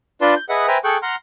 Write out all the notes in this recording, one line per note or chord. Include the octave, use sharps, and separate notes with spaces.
D4 F4 B4 D5 A5 C6
G6
G#4 B4 D#5 E5 F#5
B4 C5 E5 G5 G#5 A#5
G#4 A4 G5 C#6 F#6
F#5 A#5 C6 F6